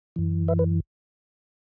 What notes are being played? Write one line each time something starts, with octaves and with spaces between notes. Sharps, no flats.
F#2 E3
B4 E5
B4